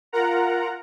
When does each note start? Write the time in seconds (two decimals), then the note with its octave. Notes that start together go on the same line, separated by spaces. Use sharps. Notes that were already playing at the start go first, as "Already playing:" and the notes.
0.13 F4 A#4 F#5 A#5